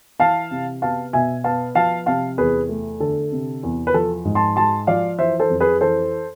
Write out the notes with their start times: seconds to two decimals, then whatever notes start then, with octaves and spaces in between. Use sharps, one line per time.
0.19 E3 F5 A5
0.51 C3
0.82 B3 F5 A5
1.13 B2 E5 G#5
1.44 B3 F5 A5
1.75 F3 F5 A5
2.06 C3 F5 A5
2.38 E2 G#4 B4
2.69 A3
3.00 D3 A4
3.32 C3
3.63 E2
3.87 B4
3.94 F3 A4
4.25 G#2
4.35 A5 C6
4.56 G#3 A5 C6
4.87 F3 D5 F5
5.18 E3 C5 E5
5.40 A4 C5
5.50 F2
5.60 G#4 B4
5.81 E3 A4 C5